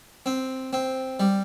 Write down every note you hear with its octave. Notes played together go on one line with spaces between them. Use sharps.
C4
C4
G3